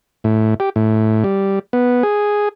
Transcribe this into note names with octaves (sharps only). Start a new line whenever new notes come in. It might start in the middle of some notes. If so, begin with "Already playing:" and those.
A2
G4
A2
G3
B3
G#4